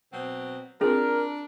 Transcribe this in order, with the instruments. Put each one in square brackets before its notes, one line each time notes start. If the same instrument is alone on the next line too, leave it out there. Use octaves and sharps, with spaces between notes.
[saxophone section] B2 F#3 C4
[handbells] C4 F4 G#4 [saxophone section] D4 [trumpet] A#4